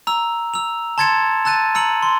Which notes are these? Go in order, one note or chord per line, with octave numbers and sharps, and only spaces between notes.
A#5 E6
E6 F7
A5 C6 G#6 A6 C#7 E7
A5 E6 F#6 A6 D#7
A#5 E6 C#7 F#7
C6